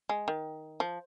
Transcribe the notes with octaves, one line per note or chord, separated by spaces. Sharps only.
G#3
D#3
F3